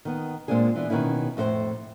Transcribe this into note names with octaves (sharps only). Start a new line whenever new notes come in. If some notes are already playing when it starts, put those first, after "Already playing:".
D#3 B3
A#2 G#3 A#3 C4 D4 G#4
E3 B3 D4
B2 D#3 B3 C#4 E4
F2 A2 F#4 C5